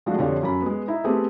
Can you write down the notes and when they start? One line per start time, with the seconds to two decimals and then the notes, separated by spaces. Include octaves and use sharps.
0.06 F3 G#3 A3 D4 F#4
0.18 F2 D3 F3 G4 C#5
0.43 F#2 B5
0.62 G#3 B3
0.88 D#4 E4 E5
1.04 A3 B3 C4 G4 G#4 B4